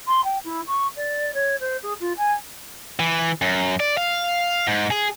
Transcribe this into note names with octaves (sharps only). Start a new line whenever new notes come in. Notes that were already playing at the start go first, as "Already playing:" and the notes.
C6
G5
E4
C#6
D5
C#5
C5
G#4
F4
G#5
E3
F#2
D5
F5
G#2
G#4